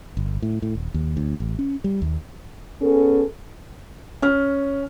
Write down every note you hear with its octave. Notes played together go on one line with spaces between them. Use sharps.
G1
A2
A2
D#1
D#2
D2
A1
C#4
G3
D#2
B3 C#4 G#4 A4
C#4 F6